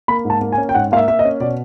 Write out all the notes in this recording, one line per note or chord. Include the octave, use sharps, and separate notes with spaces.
A#3 B5
G#2
A5
A#3
G#5
C#4
G5
G#2 F#5
A#3 E5 F5
A#3 E5
D#5
C#4
B2 D5